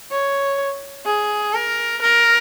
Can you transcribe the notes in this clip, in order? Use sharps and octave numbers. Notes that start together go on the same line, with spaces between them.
C#5
G#4
A#4
A#4